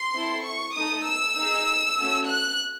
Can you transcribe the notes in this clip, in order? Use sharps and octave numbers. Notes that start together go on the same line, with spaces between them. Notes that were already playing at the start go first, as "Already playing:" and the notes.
Already playing: C6
C4 E4 A4
C#6
A3 D#4 A4 D#6
E6
D#4 G#4
A3 C#4 F#4 A4
F#6